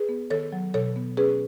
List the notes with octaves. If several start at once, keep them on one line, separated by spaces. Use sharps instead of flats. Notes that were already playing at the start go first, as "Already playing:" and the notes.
Already playing: G#4 B4
B3
D#3 A4 C#5
F#3
B2 A4 C#5
B3
C#4 G#4 B4